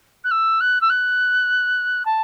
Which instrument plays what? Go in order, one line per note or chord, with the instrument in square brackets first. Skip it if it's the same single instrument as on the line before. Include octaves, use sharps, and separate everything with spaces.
[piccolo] F#6
E6
F#6
E6
F#6
A5